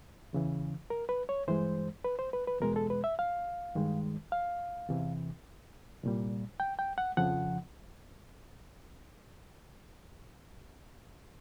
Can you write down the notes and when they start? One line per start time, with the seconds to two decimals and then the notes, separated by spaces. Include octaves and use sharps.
0.33 E2 C#3 E3
0.90 A#4
1.09 B4
1.29 C#5
1.47 G2 E3 G#3 C5
2.05 B4
2.19 C5
2.33 B4
2.47 B4
2.61 E2 B2 G#3 A#4
2.76 A4
2.90 B4
3.04 E5
3.19 F5
3.75 G2 D#3 G#3
4.32 F5
4.89 E2 C3 E3
6.03 C2 A#2 G3
6.60 G5
6.79 G5
6.98 F#5
7.17 F2 C#3 F3 F#5